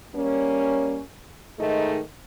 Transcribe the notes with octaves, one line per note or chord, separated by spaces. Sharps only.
G3 A#3 C#4
G#2 D#3 G#3 A3 D#4